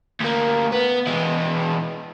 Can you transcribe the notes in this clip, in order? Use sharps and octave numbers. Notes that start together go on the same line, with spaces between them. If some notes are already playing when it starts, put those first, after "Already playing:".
D2 A#3
B3
E3 G#3